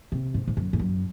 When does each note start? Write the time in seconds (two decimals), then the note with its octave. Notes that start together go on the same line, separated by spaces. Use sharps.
0.12 C3
0.34 G#2
0.48 G#2
0.57 F#2
0.73 G#2
0.79 F#2